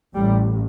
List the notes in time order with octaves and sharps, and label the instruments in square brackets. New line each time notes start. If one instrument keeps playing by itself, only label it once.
[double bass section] A1 A2 G3